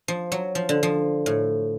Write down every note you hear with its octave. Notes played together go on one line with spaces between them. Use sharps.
F3
F#3
F3
D3
F3
A2